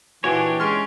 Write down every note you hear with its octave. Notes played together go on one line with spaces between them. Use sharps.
A#2 E3 D4 F#4 G4 C#5 G#5
G#3 C#4 C6 F6